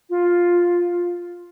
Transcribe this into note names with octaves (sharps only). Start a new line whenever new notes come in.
F4